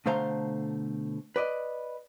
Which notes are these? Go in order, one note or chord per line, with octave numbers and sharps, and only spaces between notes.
B2 D3 A3 C5 F5 A#5
B4 D5 D#5